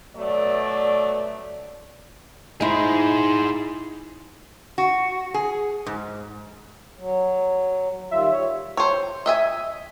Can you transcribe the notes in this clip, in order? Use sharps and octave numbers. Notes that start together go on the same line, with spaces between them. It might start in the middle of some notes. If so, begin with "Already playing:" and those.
B2 F#3 A3 D5
D#4 E4 G#4 C5
F#4
G#4
G#2
F#3
D#3 G3 F4 E5
G3 C#5
C5 C#5
D#5 E5 G#5